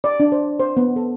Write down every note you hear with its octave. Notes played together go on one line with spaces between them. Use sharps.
D5
D4
C5
C5
B3
A4